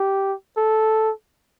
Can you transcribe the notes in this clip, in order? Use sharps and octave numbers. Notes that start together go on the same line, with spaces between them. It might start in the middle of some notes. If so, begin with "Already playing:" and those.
Already playing: G4
A4